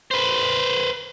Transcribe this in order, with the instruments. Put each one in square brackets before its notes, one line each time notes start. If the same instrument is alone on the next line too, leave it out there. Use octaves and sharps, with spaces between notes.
[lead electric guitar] B4 C5